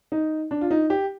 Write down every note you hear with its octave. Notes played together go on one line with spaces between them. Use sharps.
D#4
D4
F4
D#4
G4